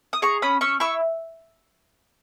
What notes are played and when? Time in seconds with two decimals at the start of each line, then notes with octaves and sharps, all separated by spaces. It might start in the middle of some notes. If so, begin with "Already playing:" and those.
0.13 D#6
0.22 G#4 A#5 C#6
0.42 C#4 B5 D#6
0.61 C#4 C#6 E6
0.80 E4 C#6 E6